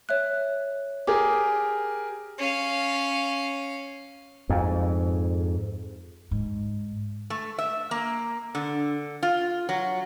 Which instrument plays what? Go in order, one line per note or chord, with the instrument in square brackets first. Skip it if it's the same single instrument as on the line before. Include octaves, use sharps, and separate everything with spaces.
[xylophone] C#5 E5 F#6
[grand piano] G4 G#4 A#4 [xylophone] D6
[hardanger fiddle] C#4 F5
[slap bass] F2 G#2
[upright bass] G#2
[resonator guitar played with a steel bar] A3
E5
A#3
D3
F4
F#3